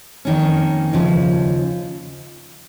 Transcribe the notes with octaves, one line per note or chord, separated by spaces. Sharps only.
F2 D#3 A#3 C#4
D#2 C#3 F3